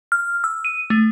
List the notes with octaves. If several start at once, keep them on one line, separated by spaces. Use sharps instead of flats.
F6
E6
D#7
A3